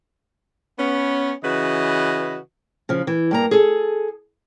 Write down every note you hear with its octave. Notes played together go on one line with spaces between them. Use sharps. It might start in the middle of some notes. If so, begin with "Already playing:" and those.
B3 C#4
C#3 E3 F#4 B4 D#5
C#3 F3
E3
G2 A#3 A#5
G#4 A4